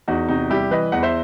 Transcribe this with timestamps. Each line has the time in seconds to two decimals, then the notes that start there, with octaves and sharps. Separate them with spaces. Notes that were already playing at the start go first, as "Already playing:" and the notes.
0.08 E2 D#4 F#4
0.29 C3 D#4 F#4
0.50 G3 E4 G4
0.71 E3 B4 D#5
0.92 E2 F#5
1.03 C5 E5